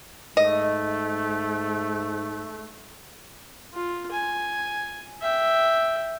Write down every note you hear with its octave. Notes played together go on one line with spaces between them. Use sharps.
G#2 A3 D#5
F4
G#5
E5 G5